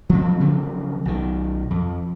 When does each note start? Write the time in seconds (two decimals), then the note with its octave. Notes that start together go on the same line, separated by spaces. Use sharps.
0.09 F3 F#3 C4
0.40 C#3 F3 F#3 C4
1.05 B1 D#3
1.71 F2